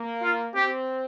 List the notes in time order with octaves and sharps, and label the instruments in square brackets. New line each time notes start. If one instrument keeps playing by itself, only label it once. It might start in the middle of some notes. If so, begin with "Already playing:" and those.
Already playing: [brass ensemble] A#3
[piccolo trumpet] F4
[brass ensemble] C4 [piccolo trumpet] G4